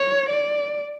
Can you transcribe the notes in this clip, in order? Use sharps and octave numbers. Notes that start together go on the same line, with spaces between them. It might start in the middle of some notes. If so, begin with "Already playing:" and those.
Already playing: C#5
D5